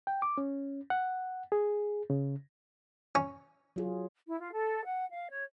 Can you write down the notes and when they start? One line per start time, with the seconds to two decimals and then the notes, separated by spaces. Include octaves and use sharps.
0.07 G5
0.22 D6
0.38 C#4
0.90 F#5
1.52 G#4
2.10 C#3
3.15 C#4
3.76 F#3 F4 G#4
4.27 E4
4.39 F4
4.53 A4
4.84 F#5
5.11 F5
5.30 C#5